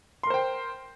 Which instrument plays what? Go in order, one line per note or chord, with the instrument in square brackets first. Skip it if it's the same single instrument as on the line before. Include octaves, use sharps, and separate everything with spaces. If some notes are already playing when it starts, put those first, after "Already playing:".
[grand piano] C6
A#4
C5
G5